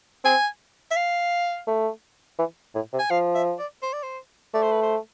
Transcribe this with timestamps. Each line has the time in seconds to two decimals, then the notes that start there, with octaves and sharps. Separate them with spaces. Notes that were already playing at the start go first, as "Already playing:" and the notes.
0.24 C4 G#5
0.91 E5
0.96 F5
1.67 A3
2.39 E3
2.75 A2
2.93 C3
2.99 G#5
3.10 F3 F5
3.35 E5
3.59 D5
3.82 C5
3.93 D5
4.03 C5
4.54 A3 D5
4.62 C5
4.72 B4
4.82 C5